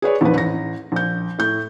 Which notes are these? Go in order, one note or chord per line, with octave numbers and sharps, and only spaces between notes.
G#4 B4 C#5 D5
A#1 E2 D#3 B4
A1 A#6
A#1 G6
A2 G6